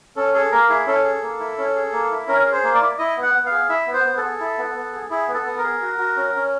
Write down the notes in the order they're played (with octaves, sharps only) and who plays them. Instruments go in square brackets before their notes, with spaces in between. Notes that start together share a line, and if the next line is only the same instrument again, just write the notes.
[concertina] C#4 A4
G#4 A4
A#3 A#4
E4 G#4
C#4 A4
G#4
A#3
E4
C#4
G#4
A#3
E4
C#4 A#4
G#4
C5
A#3
D5
E4
E4 D#5
B3
F#5
B3
F5
G#4
E4 E5
B3
C5
B3
A4
G#4
E4
B3
B3
G#4
E4 G#4
B3
A4
B3
A#4
G#4
F#4
F#4
C#4
C#4